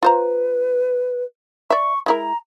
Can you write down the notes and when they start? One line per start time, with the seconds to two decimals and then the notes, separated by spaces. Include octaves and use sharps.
0.03 F4 B4 C5 A#5
1.70 D5 E5 C#6
2.06 G#3 E4 A#4 A#5